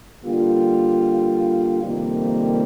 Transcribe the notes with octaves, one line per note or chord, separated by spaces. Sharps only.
D3 G3 A#3 F4
F2 C3 D#3 G3 A#3